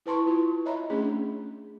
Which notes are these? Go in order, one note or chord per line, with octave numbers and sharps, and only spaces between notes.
E4 B4 A5 C6 C#6
E4 F4
C#5 D#5 E5 A#5 B5
A3 C#4 D4 G#4